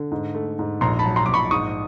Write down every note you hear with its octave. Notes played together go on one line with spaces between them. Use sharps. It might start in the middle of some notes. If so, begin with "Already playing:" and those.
Already playing: D3
G#2
A3
G#2
A#1 A#5 C6
A5 B5
F#3
A#5 C6
A#1 D6
B5 C#6
G#2 C#6 D#6